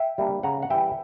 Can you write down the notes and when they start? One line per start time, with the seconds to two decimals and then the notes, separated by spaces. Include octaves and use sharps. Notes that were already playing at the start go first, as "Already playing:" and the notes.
Already playing: E5 G5
0.18 G3 A#3 D4
0.43 C#3 F#5 A#5
0.63 F#5
0.70 E3 G3 E5 G5